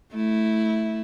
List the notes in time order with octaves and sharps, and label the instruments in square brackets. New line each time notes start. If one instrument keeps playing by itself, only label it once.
[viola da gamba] A3 E4